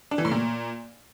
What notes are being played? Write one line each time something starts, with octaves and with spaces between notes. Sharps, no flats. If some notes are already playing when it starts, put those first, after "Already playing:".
D4
E3
A2
A#2